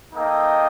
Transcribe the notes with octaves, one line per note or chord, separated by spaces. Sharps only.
A#3 D#4 A4 D#5 G5